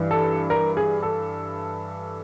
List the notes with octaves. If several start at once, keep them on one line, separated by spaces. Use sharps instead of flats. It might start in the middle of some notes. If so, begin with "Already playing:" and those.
Already playing: G2 E3
A4
A#4
G#4
A4